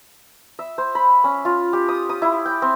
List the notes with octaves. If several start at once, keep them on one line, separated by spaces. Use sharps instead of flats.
E5
C5
B5
C#4
F4
G4
D#6
D#6
E4
G5
C4